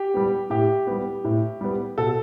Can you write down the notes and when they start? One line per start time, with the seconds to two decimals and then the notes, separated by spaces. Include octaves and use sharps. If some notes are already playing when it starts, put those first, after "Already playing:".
Already playing: G4
0.14 G3 B3
0.50 A2 G4
0.87 G3 B3
1.24 A2
1.61 G3 B3
1.98 B2 A4